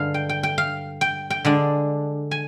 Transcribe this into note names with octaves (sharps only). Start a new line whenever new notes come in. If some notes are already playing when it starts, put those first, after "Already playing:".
Already playing: G2 D3 G#3 F5
G5
G5
G5
F5
G5
G5
D3 G#3 D4
G#5